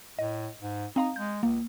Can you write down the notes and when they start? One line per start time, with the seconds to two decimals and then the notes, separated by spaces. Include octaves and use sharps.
0.19 A2 D#5
0.61 G#2
0.96 C4 D#4 F5 A#5
1.16 G#3 G6
1.43 C#2 A#3